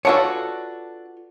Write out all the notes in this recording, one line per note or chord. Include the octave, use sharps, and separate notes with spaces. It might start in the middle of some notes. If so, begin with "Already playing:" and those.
D4 F4 F#4 A4 B4 C#5